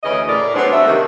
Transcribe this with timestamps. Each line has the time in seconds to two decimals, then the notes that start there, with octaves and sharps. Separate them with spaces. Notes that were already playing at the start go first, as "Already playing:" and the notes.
0.03 D2 C#3 E3 C#4 D#5
0.28 A2 A#4 D5
0.55 F#3 G#3 B3 C4 D4 G#4
0.72 B3 D4 F#4 E5
0.86 C3 D#3 A#3